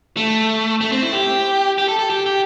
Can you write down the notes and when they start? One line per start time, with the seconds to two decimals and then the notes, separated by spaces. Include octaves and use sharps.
0.17 A3
0.81 A3
0.92 C4
1.03 E4
1.13 G4
1.78 G4
1.88 A4
1.99 A4
2.10 G4
2.26 G4